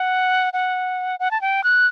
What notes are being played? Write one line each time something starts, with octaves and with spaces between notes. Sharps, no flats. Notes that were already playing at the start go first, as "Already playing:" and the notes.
Already playing: F#5
F#5
F#5
A5
G5
F#6